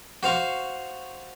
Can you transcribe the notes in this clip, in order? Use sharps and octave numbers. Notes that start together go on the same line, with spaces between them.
F#4 C5 F5 C#6